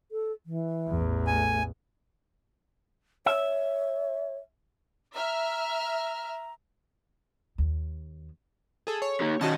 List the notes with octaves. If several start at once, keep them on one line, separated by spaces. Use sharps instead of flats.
A4
E3
A1 E2
A3 G#5
C#5 E5
E5 A#5 F6
D#2
G#4 A4
C#5
A#3 D#4 G4
D#3 C#4 F#4 D#5 A5